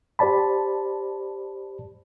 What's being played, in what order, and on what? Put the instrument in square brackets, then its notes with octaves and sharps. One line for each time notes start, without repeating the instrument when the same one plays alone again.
[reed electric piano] G4 C5 D5 A5 B5